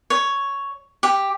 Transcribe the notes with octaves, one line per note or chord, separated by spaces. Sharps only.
C#5
G4